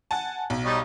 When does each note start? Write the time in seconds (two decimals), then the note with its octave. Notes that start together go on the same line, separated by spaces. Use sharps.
0.11 F#5 G#5 A5
0.50 B1
0.65 G3 D#4 C#5